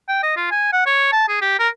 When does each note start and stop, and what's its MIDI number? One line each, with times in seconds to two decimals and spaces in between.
0.09 0.21 79
0.23 0.35 75
0.37 0.48 65
0.51 0.72 80
0.73 0.85 78
0.86 1.11 73
1.13 1.28 81
1.29 1.39 68
1.42 1.55 67
1.60 1.69 70